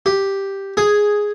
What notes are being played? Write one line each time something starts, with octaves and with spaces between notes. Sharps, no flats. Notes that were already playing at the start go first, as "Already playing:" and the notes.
G4
G#4